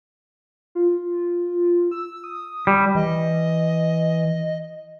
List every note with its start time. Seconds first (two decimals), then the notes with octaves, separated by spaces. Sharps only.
0.75 F4
1.91 E6
2.24 D#6
2.67 G3
2.95 E3 D#5